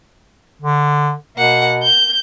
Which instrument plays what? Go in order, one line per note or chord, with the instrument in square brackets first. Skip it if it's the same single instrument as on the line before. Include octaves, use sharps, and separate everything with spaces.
[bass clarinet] D3
[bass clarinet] B2 [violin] A#3 F#5
[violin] G6